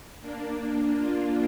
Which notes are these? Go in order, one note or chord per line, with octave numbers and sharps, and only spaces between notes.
A#3 D4
D4 F4